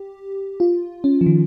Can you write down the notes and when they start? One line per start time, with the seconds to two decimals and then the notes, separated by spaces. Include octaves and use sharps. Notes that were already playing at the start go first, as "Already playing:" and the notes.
Already playing: G4
0.60 F4
1.04 C#4
1.21 F3
1.26 D#3